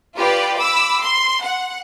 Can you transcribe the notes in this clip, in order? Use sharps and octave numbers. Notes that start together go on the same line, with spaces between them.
F4 G4 B4 D5
B5 D6 E6
C6
F#5